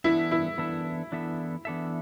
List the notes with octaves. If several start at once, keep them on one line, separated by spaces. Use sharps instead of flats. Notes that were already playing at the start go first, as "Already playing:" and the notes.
E3 B3 D4 E4 A4 E5
E4
E3 B3 D4 A4 E5
E3 B3 D4 A4 E5
E3 B3 D4 A4 E5